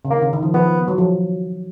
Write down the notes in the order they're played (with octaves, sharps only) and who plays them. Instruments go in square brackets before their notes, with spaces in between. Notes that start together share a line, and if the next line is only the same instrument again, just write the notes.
[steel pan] C#3
[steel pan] D#3 [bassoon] A#3
[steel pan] C#3
D#3
F3
[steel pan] F3 [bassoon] B3
[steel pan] F#3
F3